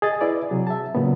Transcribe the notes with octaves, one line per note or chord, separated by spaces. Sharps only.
G#4 D#5 A6
E4 B4 D5
C3 F#3 G#4
E5 A5
A#2 C#3 F#3 B3